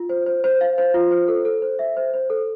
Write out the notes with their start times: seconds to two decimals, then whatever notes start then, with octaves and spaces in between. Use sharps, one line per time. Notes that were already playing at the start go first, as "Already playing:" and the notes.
Already playing: F4
0.09 C5
0.26 C5
0.44 C5
0.61 F5
0.78 C5
0.94 F4
1.11 C5
1.28 A4
1.45 A4
1.62 C5
1.79 E5
1.97 C5
2.14 C5
2.30 A4